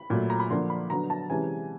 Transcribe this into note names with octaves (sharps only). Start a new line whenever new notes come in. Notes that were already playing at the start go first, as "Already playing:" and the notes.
Already playing: B5
A#2 F#3 A3
A#5
B5
D3 F3 A#3 D4 C6
B5
D3 F#3 B3 D4 A#5
A5
C3 E3 G#3 C#4 G#5